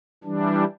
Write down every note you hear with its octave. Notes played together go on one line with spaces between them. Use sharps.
E3 G3 D4